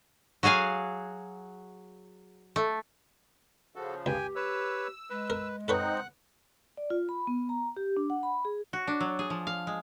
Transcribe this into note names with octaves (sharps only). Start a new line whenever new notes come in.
F#3 F#4 G#4 F5 G#5
A3
C#3 F3 F#4 A4
C#2 G4 G5 G#5
B4 C#5 E6
G#3 B4
A#4
C4 D#4 A4 B4 C#5 F#5 F#6
D5
F4
B5
B3
A#5
G4
D4
F#5
B5
G#4
F#4
D4
F#3
G#4
F3
F5
G#3